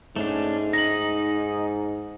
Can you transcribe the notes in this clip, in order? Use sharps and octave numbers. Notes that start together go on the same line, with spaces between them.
G#2 A3 C#4 D4
D#4 A#6 F#7